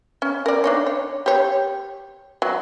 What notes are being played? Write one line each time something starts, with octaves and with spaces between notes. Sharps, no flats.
C#4
A#4 D5
D4 D#4 C#5
C#5
G4 C#5
F#3